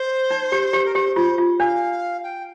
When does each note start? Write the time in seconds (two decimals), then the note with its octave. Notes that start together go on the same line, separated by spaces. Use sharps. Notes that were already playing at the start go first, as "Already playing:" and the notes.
Already playing: C5
0.31 D#4
0.52 G4
0.73 G4
0.85 A#4
0.95 G4 C5
1.16 F4 C5
1.38 F4
1.59 D4 F5
2.23 G5